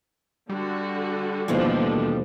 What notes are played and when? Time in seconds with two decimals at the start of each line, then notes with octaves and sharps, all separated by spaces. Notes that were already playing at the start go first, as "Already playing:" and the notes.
0.49 D3 G3 F#4
1.48 D#2 B2 E3 F3 A3 A#3 C4 D4